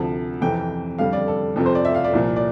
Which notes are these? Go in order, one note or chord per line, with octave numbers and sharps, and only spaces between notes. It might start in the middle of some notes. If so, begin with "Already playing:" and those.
Already playing: D2 C3 F3 A5
F2 C3 E3 G5
F2 D3 G3 F5
D5
A4
F2 C3 F3 A4
C5
D5
E5
F5
D5
C2 A#2 F3
D5